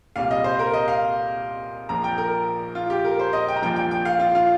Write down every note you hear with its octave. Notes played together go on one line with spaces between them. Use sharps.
C2 A#2 G3 F5
D#5
C5
A#4
D#5
F5
A#1 A#2 F3 A#5
G5
A#4
F4
G4
A#4
C5
D#5
G5
A#5
A#1 A#2 F3 G5
G5
G5
F5
F4
F4